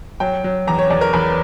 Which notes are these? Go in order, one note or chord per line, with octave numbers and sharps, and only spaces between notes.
F#3 G5
F#3
E2 A#5
C#5
E2 D5
A#4
E2 B4